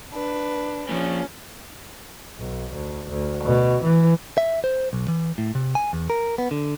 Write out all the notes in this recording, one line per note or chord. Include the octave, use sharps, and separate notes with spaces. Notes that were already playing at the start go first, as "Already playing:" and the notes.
D4 B4
A#2 F3 C#4
B1
D2
D2
B2
E3
E5
C5
B1
E3
A2
C3
G#5
E2
A#4
B3
D3